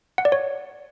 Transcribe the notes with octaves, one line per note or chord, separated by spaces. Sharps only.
F#5
D5
C#5